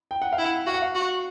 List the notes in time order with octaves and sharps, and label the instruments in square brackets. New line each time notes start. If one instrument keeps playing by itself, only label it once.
[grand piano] G5
F#5
F5
[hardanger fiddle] E4
[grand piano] F#5
[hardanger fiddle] F#4 [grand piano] F5
[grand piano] F#5
F5
[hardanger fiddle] F#4